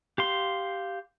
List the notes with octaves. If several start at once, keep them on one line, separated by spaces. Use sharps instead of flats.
G4 F5 C6